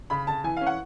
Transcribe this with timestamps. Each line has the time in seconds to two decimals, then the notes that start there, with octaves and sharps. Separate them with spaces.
0.10 C#3 B5
0.27 C#3 A5
0.44 E3 G#5
0.57 C#4 F5
0.67 F#5